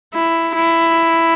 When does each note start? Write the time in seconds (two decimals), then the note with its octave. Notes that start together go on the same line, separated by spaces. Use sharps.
0.14 E4
0.56 E4